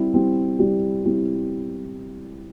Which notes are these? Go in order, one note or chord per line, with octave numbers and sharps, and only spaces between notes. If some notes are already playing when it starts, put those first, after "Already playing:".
Already playing: G3 C4 E4 G4
G3 C4 E4 G4
G3 C4 E4 G4
G3 C4 E4 G4